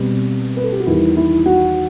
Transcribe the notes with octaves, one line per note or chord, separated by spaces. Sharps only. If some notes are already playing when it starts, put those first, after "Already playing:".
Already playing: B2 G3 C4
B4
A4
G4
F#4
E2 D#3 G3 E4
E4
F#4